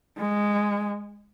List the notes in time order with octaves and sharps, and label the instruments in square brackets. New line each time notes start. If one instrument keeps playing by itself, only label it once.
[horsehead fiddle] G#3